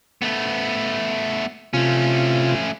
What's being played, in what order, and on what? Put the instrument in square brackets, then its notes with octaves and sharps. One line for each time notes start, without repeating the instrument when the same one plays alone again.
[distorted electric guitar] A3 B3
[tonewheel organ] C3 F4 [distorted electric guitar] A3 C#4